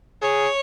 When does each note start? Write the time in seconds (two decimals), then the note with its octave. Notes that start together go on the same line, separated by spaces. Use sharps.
0.22 G#4 C#5